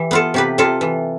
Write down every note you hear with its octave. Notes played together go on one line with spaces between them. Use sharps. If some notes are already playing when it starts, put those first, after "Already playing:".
Already playing: E3 G4
B3 F4 A4
C3 G4 B4
C3 F4 A4
E3